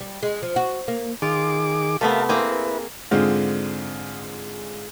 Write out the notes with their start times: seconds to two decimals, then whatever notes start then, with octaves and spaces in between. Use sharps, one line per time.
0.01 G3
0.23 G#3
0.42 F3
0.56 F#4
0.88 A#3
1.22 D#3 F4 G#4 D6
2.01 C3 A3 B3 A#4 F5 A5
2.29 A#3 C4 E4 G#4 B4
3.11 G#2 D3 G#3 C4 F4